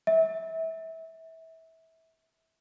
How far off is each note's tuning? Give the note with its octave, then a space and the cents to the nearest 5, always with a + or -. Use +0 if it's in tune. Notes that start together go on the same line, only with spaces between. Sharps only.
E5 -25